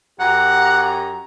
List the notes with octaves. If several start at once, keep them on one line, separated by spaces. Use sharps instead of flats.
F#2 G4 F#5 A#5